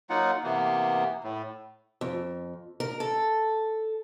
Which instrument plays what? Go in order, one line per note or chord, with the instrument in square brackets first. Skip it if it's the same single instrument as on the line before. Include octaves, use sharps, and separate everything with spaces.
[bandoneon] F#3 A#3 D#4 F4 F#5
C3 E3 A#3 B3
A2
[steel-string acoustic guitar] F2
A#4
A4